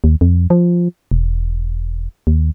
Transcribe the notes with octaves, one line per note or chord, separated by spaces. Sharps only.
D#2
F2
F3
E1
D#2